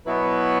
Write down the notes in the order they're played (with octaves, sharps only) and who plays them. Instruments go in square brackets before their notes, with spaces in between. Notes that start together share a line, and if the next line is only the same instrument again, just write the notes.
[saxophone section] B2 F#3 B3 E4 B4